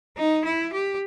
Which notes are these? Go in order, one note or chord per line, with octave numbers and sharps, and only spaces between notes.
D#4
E4
G4